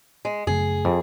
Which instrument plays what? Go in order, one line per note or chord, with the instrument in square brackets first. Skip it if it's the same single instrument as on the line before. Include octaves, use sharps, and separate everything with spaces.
[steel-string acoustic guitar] G#3
[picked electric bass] F#2 C#3 A3 [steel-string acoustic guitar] G#4
[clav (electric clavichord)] F2